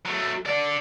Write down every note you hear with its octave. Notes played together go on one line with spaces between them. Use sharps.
F#3 A3
D3 D5